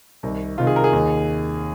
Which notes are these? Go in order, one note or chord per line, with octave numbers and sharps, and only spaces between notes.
C2 C3 D#3
C2 C3 D#3 F4
G#4
A#4
G#4
D#2 D#3